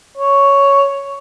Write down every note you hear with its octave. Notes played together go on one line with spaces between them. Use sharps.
C#5